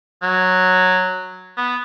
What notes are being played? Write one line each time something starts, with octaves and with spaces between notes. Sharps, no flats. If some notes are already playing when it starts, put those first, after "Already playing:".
F#3
B3